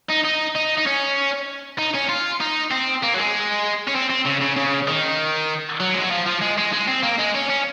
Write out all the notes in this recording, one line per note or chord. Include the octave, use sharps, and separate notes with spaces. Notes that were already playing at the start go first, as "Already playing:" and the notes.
D#4
D#4
D#4
D#4
C#4
D#4
C#4
F4
D#4
C4
A#3
F#3
G#3
C#4
C4
C4
C#3
C#3
C#3
D#3
F#3
G#3
F#3
F3
F3
G#3
G#3
G#3
C4
A#3
G#3
C#4
C#4